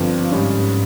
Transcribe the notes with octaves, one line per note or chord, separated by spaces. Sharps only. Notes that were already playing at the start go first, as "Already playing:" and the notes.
Already playing: G1 G2 F3 C4
G#2 G3 C#4